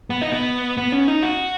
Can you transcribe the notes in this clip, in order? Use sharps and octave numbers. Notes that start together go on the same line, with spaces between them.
B3
D#4
B3
B3
C#4
D#4
F#4